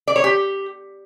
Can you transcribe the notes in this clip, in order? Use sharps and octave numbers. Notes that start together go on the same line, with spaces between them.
D5
C#5
G4